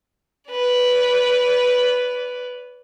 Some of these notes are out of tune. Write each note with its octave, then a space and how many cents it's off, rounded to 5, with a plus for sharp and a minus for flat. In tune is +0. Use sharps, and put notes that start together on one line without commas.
B4 +0 D5 -35